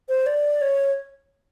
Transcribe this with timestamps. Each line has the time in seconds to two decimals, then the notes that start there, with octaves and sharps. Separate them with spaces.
0.09 C5
0.26 D5
0.61 C#5